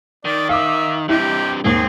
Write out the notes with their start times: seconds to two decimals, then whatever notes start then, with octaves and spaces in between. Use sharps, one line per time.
0.25 D#3 D5
0.49 E5 F5 D6
1.09 G2 C3 E4 G4 D#5
1.64 D#2 G#2 C4 G#4